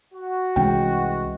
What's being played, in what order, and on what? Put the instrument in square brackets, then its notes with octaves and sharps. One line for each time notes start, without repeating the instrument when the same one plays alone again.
[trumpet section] F#4
[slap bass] C2 A3 C#4 [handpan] E3 G#3 [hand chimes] G5